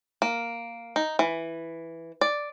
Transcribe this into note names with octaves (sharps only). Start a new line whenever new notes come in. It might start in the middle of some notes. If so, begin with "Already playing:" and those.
A#3
D#4
E3
D5